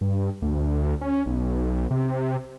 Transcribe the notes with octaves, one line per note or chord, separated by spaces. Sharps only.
G2
D2
C#4
B1
C3